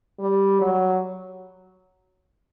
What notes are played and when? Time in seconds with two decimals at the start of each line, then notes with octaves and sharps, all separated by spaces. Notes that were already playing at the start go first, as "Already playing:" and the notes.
0.20 G3
0.61 F#3